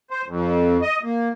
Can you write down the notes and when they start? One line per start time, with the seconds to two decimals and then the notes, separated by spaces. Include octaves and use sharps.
0.10 C5
0.27 F2
0.82 D#5
1.03 A#3